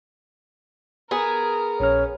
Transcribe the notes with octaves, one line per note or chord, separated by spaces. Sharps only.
B3 G#4 A#4
A#1 C#4 C#5 F6